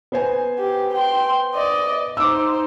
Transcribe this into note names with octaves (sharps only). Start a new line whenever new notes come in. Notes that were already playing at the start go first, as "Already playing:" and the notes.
B3 C5 G#5
G4
G5 C6
D5 D#5
D#4 C5 D6 E6